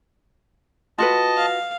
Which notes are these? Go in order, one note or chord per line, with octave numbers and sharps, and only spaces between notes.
F4 F#4 B4 D#5 A5
F5